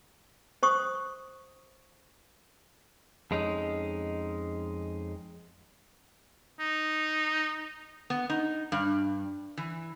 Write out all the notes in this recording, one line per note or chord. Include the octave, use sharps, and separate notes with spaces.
C5 C#6 D#6
F2 G#3 C#4 D#4
D#4
B3
D#4
G2
E3